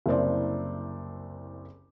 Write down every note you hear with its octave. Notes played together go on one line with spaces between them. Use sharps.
F#1 C2 C5 D5